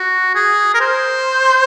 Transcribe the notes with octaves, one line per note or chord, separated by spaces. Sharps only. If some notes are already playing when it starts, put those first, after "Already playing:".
Already playing: F#4
G#4
A#4
C5